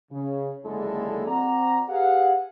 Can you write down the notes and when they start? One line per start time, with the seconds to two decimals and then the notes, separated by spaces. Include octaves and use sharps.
0.12 C#3
0.65 F#1 D#2 D3 G#3 E4 A4
1.27 C4 F#4 C5 D5 A#5
1.89 G4 G#4 B4 F5 F#5